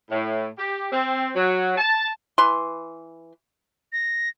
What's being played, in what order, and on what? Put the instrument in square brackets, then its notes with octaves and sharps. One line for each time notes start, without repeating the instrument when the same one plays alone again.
[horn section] A2
G4
C4
F#3
A5
[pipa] E3 B4 C6
[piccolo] A#6